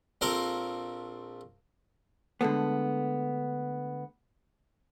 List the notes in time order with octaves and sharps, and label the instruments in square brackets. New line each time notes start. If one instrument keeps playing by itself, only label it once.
[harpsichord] A#1 C4 A4 A#4 F5 A#5
[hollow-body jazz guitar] D3 G#3 A3 B3